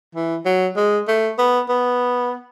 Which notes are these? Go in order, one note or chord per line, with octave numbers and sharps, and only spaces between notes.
E3
F#3
G#3
A3
B3
B3